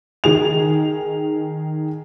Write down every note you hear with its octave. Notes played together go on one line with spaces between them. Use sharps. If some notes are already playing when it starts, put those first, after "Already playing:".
D#3 G#4 F7